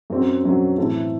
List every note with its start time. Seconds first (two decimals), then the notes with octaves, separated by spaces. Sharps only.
0.10 F#2 F#3 C4
0.43 F#2 F#3 C4
0.77 A2 E3 A3 C4 E4